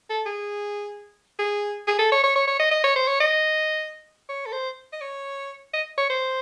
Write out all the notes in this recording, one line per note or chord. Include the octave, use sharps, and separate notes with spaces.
A4
G#4
G#4
G#4
A4
C#5
C#5
C#5
C#5
D#5
D#5
C#5
C5
C#5
D#5
C#5
A4
C5
D#5
C#5
D#5
C#5
C5